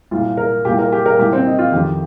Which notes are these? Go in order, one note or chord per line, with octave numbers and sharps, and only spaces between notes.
C2 A#2 F4
A#4
C2 A#2 G4
A#4
G4
A#4
C2 A#2 G4
C4
D#4
F4
F2 D#3 G4